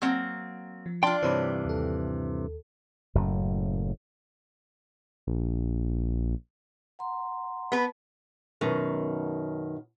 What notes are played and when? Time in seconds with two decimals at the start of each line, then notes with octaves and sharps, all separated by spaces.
0.02 F#3 A#3 C4
0.86 F3
1.03 D4 F4 G5 C6
1.23 G2 C3 E3 C5 C#5 B5
1.65 D#2 A4
3.15 F#1 F#2 A2
5.27 A#1
6.99 F#5 A#5 C6
7.72 B3 B4 A5
8.61 F#2 B2 D#3